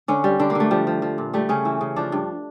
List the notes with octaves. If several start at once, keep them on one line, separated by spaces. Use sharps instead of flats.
D3 C#4
G3
D3 D4
A#3
D3 A3
F3 G3
F3
F3
A#2
G3 A3
C#3 C#4
E3 E4
C#3
F3 D4
G2